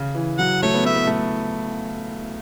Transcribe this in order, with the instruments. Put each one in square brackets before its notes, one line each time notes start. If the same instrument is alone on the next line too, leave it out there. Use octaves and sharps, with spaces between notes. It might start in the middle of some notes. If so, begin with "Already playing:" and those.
Already playing: [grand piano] C#3
E3
[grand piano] F#3 [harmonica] F#5
[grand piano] A3 [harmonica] C#5
[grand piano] B3
[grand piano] A3 [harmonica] E5
[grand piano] B3
A3